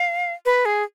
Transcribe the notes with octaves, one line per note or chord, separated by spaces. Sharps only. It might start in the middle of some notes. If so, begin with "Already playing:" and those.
Already playing: F5
B4
G#4